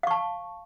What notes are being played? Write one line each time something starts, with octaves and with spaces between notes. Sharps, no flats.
F5 A5 C#6